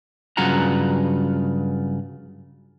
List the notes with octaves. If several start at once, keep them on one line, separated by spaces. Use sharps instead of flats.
G2 C#3 F#3 F4 F#5 A#5